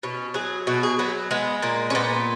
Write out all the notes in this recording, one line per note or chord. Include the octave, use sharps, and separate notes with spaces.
B2 C#4
F#3 G#4
B2 F#4
G#4
F#3 B3
G#3 B3
A#2 A#3
C#4
A#2 B3